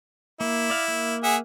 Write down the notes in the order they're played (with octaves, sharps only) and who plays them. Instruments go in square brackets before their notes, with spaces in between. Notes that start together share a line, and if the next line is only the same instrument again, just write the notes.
[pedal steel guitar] A#3 [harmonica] E4
[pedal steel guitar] D5 F5
A#3
[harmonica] G#4 E5 F#5